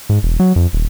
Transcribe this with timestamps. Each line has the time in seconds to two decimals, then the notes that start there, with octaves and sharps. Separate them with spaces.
0.09 G#2
0.23 E1
0.40 F#3
0.56 F2
0.73 D#1